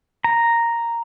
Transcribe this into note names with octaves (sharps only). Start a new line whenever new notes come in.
A#5